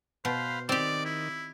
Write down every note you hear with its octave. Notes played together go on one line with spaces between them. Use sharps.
B2 B4 C5 F5
D#3 C4 G4 D5
E4